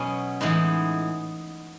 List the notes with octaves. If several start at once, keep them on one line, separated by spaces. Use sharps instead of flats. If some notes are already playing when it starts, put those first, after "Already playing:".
Already playing: B2 F#3 C#4 G#4 B4
A2 E3 G#3 B3 D#4